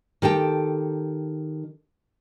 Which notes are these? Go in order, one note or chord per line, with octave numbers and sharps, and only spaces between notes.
D#3 G4 A4 G5